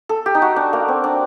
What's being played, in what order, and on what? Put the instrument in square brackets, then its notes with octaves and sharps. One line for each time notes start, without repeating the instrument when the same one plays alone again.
[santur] A4
G4
D#4
F#4
D4
A#3
C4
D4